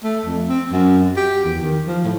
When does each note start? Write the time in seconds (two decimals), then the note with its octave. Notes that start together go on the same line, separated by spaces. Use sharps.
0.04 A3
0.26 F2
0.49 C4
0.72 F#2
1.17 G4
1.45 E2
1.62 D#3
1.87 F3
2.04 A2